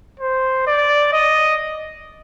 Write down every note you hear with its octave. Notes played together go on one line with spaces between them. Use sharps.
C5
D5
D#5